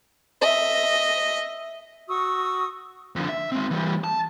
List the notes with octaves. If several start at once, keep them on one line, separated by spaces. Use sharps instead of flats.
D#5 E5
F#4 C#6 D#6 E6
F2 D3
E5
G#3 C4
E3 G3
A5